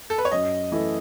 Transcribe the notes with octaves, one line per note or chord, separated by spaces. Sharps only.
A4
B4
C#5
F#2 D#5
E3 A3 E4 A4